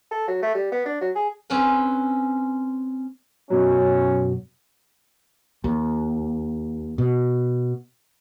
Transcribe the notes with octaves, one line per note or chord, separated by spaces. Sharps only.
A4
F#3
A3
G3
B3
D4
F#3
G#4
C4 C#4 B4
F#2 B2 F#3 C#4
D#2
B2